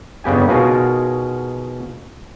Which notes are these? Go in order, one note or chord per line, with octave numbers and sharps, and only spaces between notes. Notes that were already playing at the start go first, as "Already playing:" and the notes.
G1 C#3 B3 G4 G#5
B2 D#4 F4 F#4 G#4 A#4